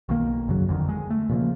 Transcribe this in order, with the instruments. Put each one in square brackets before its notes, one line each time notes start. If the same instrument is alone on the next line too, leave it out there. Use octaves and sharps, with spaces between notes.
[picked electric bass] B1 D#3 A#3
G1 F#2 C#3 F#3
F2 D3 D#3
G#3
A3
A#2 C#3 F3 A#3